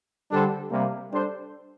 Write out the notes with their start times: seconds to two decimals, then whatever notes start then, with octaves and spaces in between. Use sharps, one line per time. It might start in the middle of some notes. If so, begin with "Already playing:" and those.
0.31 D3 G3 D4 A4 C5
0.70 C3 G3 A#3
1.10 G3 D4 A4 C5